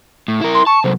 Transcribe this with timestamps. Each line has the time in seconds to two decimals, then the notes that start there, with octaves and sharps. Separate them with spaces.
0.28 A2
0.41 E4 A#4
0.54 C6
0.67 A5 C#6
0.84 C3 F#3 C5